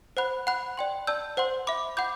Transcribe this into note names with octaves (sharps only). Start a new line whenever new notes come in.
C5 F#5 B5 F#6
F#5 B5 F#6
D5 G5 C6
D5 A5 E6 G6
C5 F#5 C6
E5 B5 D6
F#5 B5 D6 G6